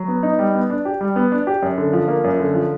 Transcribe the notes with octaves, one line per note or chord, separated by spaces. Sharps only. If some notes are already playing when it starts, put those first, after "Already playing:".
Already playing: F#3
B3
D#4
G3
B3
D4
G4
G3
B3
D4
G4
F#2
D3
F3
A#3
F#2
D3
F3